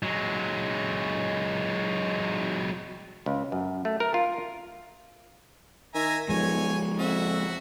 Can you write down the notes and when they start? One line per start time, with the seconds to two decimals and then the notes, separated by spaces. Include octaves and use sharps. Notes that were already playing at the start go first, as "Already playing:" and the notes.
0.03 F#3 G#3
3.26 C#2
3.52 F#2
3.85 A3
4.00 A#4
4.14 F4
5.94 D#3 E5 G#5 A#5
6.29 B1 F3 G#3 C#5 G#5
6.99 F2 F#4 E5